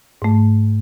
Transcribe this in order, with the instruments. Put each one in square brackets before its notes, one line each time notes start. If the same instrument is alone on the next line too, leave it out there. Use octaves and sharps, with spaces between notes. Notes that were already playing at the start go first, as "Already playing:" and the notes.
[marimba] G#2 A3